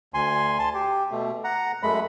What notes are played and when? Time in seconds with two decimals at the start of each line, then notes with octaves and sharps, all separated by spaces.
0.14 D2 G#5 C6
0.59 A5 C6
0.74 G4
1.11 B2 A3
1.44 F#5 A#5
1.83 F#2 G#3 A3 B5